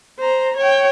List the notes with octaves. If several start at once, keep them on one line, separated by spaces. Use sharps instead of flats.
C5 A#5
C#5 G5